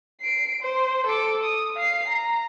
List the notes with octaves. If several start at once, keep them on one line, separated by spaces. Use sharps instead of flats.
C7 D7
C5
A4 D6
D#6
F5 C7
A#5